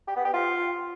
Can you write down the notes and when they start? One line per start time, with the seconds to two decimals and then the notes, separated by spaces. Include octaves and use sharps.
0.08 G4
0.16 B3
0.25 G4
0.33 F4